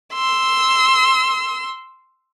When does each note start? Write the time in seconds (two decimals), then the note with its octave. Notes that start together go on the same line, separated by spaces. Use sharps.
0.14 C6 E6